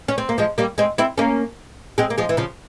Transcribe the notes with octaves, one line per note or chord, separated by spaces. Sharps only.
C#4
C4
A#3
F3 G#3
G3 A#3
G#3 C4
C4 E4
A#3 C#4
G#3 C4
A#3
F3 G#3
E3
C#3 F3